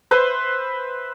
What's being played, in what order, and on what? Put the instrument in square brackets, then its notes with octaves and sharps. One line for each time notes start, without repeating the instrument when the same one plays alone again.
[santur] B4 C5 E5 C6